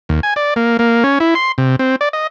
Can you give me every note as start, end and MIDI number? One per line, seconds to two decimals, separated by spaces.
0.09 0.20 39
0.23 0.34 80
0.36 0.54 74
0.56 0.77 58
0.79 1.04 58
1.04 1.19 61
1.20 1.34 64
1.35 1.52 84
1.58 1.76 48
1.79 1.96 60
2.01 2.09 74
2.13 2.27 75